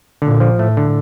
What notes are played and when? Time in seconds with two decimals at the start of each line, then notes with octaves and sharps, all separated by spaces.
0.22 A#2 D3
0.40 F3
0.59 A2 A3
0.77 D3